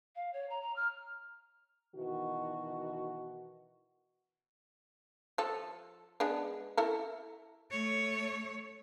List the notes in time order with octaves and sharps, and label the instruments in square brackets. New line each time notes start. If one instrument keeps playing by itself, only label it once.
[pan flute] F5
C#5
A#5
A#5
F6
[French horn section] B2 D#3 E3 F#4
[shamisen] F3 A4
G#3 B3 D4
E4 A4 A#4
[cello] A3 C#5